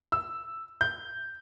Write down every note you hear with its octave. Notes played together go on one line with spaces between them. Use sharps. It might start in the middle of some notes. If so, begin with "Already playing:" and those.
E6
G6